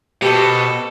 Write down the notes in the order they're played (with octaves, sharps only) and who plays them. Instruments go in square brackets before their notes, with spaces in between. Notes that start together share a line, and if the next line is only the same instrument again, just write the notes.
[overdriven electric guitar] B2 [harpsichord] G4 C5 [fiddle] A4